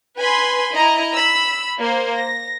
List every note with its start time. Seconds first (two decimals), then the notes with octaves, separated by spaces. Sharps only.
0.18 B4 G#5 B5 C6
0.74 E4 D#5 A#5
1.14 B5 E6
1.78 A#3 C5
2.13 A#6